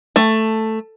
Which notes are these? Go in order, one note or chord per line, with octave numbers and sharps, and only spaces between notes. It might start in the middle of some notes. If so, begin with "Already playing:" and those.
A3